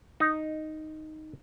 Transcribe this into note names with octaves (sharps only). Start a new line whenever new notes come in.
D#4